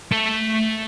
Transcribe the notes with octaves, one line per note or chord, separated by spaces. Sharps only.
A3